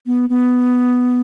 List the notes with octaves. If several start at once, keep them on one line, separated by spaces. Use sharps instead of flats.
B3
B3